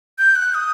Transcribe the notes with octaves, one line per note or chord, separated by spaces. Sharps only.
G6
F#6
D#6